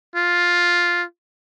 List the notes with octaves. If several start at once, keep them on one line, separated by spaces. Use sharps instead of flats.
F4